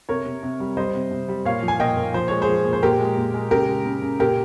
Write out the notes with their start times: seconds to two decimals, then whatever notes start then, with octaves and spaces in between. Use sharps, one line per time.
0.09 C3 A#4 C#5
0.26 C3
0.43 C3
0.60 G3
0.77 G3 C5 D#5
0.94 C3
1.11 C3
1.28 G3
1.45 A#2 C#5 F5
1.62 F3
1.68 G#5
1.80 A#2 D#5 G5
1.97 A#2
2.14 F3 C5
2.28 G#3 C#5
2.42 G#4 C5
2.49 F3
2.65 A#2
2.73 C5
2.83 A#2 G4 A#4
3.00 G#3
3.17 A#2
3.34 G#3
3.51 C#3 G4 A#4
3.68 G#3
3.85 C#3
4.02 C#3
4.19 A#2 G4 A#4